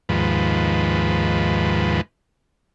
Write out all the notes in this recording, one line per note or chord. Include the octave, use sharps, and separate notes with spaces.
D#2 G#2 F3 B4